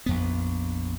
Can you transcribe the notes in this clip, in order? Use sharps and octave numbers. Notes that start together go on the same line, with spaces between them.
A#1 F2 B3